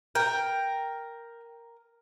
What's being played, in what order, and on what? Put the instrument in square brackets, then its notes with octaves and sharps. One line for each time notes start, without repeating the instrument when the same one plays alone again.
[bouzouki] A#4 [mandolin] G5